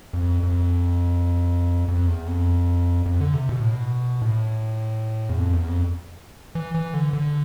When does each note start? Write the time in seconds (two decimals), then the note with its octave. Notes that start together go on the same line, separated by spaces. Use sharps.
0.13 F2
0.43 F2
1.88 F2
2.08 E2
2.27 F2
3.06 F2
3.20 D3
3.34 C3
3.49 B2
3.60 A2
3.71 B2
4.22 A2
5.29 E2
5.38 F2
5.53 E2
5.68 F2
6.55 E3
6.74 E3
6.94 D3
7.13 D3